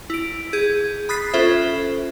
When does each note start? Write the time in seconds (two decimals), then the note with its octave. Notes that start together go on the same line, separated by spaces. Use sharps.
0.10 E4 D7
0.53 G#4 G6
1.09 B5 D#6 F#6 A6 B6 C7
1.33 C#4 F4 A4 C5 E5